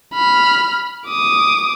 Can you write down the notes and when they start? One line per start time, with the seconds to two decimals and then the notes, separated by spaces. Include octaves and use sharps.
0.14 B5 F6
1.08 D6 D#6